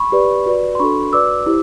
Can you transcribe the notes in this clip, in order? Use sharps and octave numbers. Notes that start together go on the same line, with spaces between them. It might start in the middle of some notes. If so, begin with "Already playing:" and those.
Already playing: B5 C#6
G4 B4 D5
F#4 B4 D5
C6
D4 F#4 A4 B5 C#6
F#4 B4 D5 D6 E6
E4 G4 C5